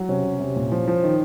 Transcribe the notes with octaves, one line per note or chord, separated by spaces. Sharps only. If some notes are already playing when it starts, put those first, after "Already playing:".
Already playing: F#3
C3 C#4
C3
C3
A#2
F3
F3
D#3